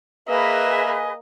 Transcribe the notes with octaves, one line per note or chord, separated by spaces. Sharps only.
A#3 G#4 B4 D#5 E5 G#5